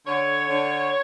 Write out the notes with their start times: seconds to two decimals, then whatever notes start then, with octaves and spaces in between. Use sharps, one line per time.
0.07 D3 C#5
0.48 D3